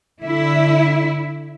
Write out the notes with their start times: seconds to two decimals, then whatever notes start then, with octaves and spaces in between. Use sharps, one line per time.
0.23 D3 E4